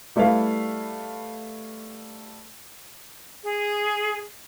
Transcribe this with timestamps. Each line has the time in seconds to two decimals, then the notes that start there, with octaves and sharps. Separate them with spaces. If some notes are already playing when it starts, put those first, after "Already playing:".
0.16 G3 A3 E4 B4 F5
3.44 G#4